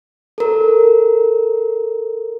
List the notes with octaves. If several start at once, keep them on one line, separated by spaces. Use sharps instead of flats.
A4 A#4